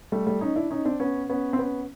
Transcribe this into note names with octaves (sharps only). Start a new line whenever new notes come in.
G3 A3
G3 A3
C#4 D#4
D4 E4
C#4 D#4
C4 D4
B3 C#4
B3 C#4
C4
B3 C#4